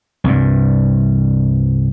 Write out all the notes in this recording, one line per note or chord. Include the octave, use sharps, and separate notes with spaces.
C2 G2